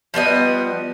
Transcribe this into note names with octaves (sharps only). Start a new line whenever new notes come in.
F3 G3 B3 D#5